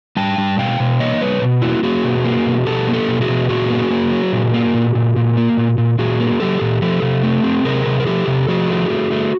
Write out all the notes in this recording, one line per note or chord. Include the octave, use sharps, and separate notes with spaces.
G3 G5 A5
G3
B2 F5 G5
B2
A#3 C#5 D#5
G3 B4 C#5
B2
A#3 E4 F#4
A#3 F#4 G#4
B2
A#3
B2
B2 G4 A4
A#3
G4 A4
B2
F#4 G#4
B2
A#2 F#4 G#4
A#3
A#3
F#3
A#2
A#3
A#2
A#2
A#2
A#3
A#2
A#2
A#2 F#4 G#4
A#3
F#3 G4 A4
A#2
F3 G4 A4
C3
A3
C4
C3 G#4 A#4
C3
A#4
F3 G4 A4
C3
F3 F#4 G#4
A3
A3
A3